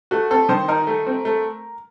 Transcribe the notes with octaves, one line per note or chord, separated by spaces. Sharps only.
A3 F#4
C4 A4
D#3 C5
D#4 A#4
A3
C4
A3